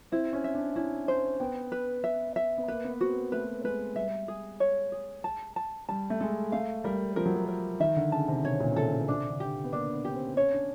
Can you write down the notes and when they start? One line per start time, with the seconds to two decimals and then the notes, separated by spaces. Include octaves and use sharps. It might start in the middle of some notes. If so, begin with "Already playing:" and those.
0.12 C4 E4
0.33 C#4
0.44 E5
0.55 D4
0.76 C#4 E4
1.08 C5
1.40 B3 G5
1.72 B4
2.04 E5
2.36 E5
2.58 B3
2.68 A#3 B4
2.84 B3
3.00 C4 F#4
3.16 A#3
3.32 A3 B4
3.64 G#3 B4
3.96 G3 E5
4.28 G#4
4.60 C#5
4.92 G#4
5.24 A5
5.56 A5
5.89 G3 A5
6.10 A3
6.20 G#3 A4
6.52 A3 F5
6.84 G3 A#4
7.16 F3 A#4
7.26 F#3
7.35 F3
7.48 A#4
7.80 D#3 E5
7.96 D3
8.12 C#3 A5
8.28 C3
8.44 B2 C#5
8.60 A#2
8.71 C#3
8.76 C3 A4
8.92 C#3
9.08 C3 D4
9.30 D3
9.40 G4
9.64 B3
9.72 A#3 D4
9.93 B3
10.05 C#4 G4
10.15 C4
10.37 C#4 C#5
10.52 D4